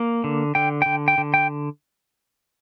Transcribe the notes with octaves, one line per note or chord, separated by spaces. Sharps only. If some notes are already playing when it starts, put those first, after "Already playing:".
Already playing: A#3
D3
D3 G5
D3 G5
G5
D3
G5